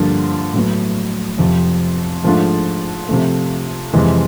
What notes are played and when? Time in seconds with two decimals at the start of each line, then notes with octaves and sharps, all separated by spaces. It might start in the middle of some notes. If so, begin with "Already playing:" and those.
Already playing: G2 D3 F3 A#3
0.54 A2 F#3 B3
1.38 F2 C3 F3
2.24 G#2 F3 A3 D4 F4
3.08 C3 F3 A3
3.93 F2 C3 E3 G#3